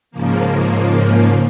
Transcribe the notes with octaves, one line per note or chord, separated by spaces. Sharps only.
G#2 C#3 F3 A#3